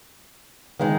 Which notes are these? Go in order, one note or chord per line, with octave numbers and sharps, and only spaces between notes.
D#3 G#3 D#4